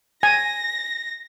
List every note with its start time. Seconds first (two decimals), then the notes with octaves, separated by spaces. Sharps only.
0.23 G#5 A#6